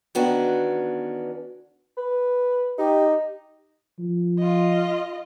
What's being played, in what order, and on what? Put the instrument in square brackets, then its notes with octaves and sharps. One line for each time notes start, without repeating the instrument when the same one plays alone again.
[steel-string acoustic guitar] D#3 E3 B3 C#4 D4 F#4
[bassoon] B4
[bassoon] D#4 [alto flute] G4
[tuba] F3
[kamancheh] F4 D#5